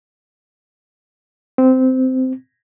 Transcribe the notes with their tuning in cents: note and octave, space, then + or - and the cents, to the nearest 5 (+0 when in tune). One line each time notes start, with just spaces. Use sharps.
C4 -15